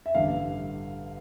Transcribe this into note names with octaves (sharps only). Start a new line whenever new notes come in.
E5
A1 G2 D3 F5